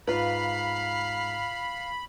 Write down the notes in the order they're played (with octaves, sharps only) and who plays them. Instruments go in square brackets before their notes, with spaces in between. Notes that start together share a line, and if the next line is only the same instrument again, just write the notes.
[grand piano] G#2 [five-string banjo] F4 B4 [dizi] F5 [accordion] B5